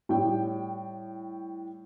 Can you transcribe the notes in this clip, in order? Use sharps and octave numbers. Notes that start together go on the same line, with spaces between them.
A2 G3 G5